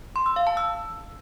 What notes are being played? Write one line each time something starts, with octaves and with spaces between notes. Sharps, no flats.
C6
E6
F5
A5
E6